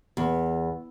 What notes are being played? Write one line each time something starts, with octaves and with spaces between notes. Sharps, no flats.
E2